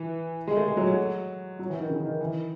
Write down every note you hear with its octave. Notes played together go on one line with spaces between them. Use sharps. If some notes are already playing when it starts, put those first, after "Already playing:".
Already playing: E3
G#3
A3
G#3
F#3
F#3
F#3
E3
D#3
C#3
D#3
E3